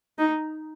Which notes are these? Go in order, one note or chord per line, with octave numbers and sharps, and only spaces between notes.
D#4